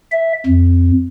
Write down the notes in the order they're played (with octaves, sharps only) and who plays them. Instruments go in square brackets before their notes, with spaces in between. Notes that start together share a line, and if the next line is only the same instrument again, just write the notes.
[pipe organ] E5
F2